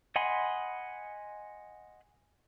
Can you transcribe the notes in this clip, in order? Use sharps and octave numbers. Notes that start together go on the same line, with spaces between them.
D#5 F#5 G#5 B5 C6